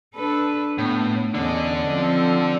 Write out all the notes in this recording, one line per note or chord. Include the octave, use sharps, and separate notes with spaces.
D4 A4 B4
A2 B3
E2 D3 C#4 D4 D#5
F3 C4 A4